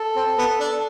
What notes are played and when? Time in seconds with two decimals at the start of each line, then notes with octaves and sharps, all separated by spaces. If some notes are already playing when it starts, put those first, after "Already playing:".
Already playing: A4
0.16 C4
0.38 B3
0.60 D4